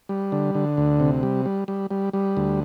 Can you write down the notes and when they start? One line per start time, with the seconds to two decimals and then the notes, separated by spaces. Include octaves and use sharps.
0.09 G3
0.32 D3
0.55 D3
0.77 D2
1.00 C3
1.23 G3
1.46 G3
1.68 G3
1.91 G3
2.13 G3
2.37 D2